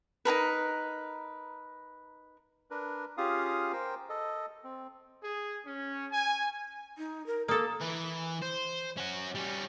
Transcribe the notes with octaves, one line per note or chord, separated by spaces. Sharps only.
D#4 G#4 A#4 B4
D4 A#4 B4
C#4 F4 G4 G#4 F5 D#6
A#4 C5 G5
A4 D#5
C4
G#4
C#4
G#5
D#4
A#4
A#3 A4 D#6
E3 B4
C5
C#4 F#4
G3 C#4